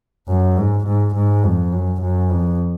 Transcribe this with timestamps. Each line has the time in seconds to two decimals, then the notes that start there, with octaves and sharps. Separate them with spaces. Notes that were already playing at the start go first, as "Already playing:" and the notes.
0.28 F#2
0.57 G#2
0.86 G#2
1.15 G#2
1.44 F2
1.72 F#2
2.02 F#2
2.30 F2